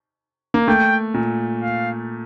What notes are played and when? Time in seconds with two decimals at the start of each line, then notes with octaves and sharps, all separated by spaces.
0.54 A#3
0.68 A3 G5
1.14 A#2
1.62 F5